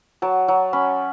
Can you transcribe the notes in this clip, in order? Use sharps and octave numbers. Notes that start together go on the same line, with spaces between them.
F#3 A5
F#3
C#4 B5